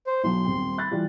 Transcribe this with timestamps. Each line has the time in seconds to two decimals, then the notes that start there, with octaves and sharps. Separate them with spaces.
0.07 C5
0.24 B1 F#3 C6
0.45 D#1 C4
0.78 B5 F#6 A6
0.91 E3 G3 F4